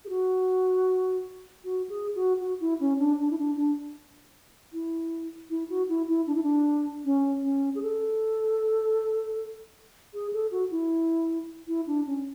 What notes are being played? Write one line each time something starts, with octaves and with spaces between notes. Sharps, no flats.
G#4
F#4
F#4
G#4
F#4
F#4
E4
C#4
D4
D4
E4
D4
D4
E4
E4
F#4
E4
E4
D4
E4
D4
C#4
C#4
G#4
A4
G#4
A4
F#4
E4
E4
D4
C#4